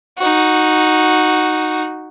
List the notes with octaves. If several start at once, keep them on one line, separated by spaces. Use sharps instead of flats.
D#4 F#4